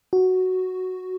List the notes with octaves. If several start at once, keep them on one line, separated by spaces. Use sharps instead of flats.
F#4